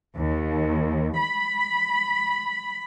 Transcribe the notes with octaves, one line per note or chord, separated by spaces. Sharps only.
D#2
B5